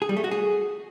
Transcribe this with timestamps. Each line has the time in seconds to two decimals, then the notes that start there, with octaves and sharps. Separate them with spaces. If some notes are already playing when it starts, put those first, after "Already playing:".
0.02 G#4
0.09 G3
0.17 A3
0.24 F#4
0.31 G#4